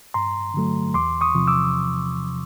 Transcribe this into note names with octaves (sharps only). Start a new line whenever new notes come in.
G2 A#5 C6
D3 F#3 A3
E2 C6 D6
C#6 D#6
C3 F3
D6 E6